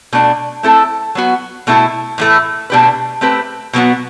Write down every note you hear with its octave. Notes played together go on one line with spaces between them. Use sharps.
B2 A3 D4
A3 C4 E4 A4
F#3 B3 F#4
B2 A3 E4 A4
A2 E3 A3 E4
B2 A3 D4 G4 B4
A3 C4 G4 B4
B2 F#3 B3 F#4